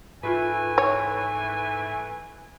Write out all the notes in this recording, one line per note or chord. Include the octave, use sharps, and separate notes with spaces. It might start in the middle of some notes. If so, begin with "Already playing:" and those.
G#2 E3 A3 F4 G#4 B4 G#5
C#5